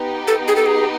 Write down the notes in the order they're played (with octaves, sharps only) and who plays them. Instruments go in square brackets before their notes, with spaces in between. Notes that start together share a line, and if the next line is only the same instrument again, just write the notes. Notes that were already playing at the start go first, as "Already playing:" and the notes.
Already playing: [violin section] B3 D#4 G4
[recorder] A4
G#4
A4
G#4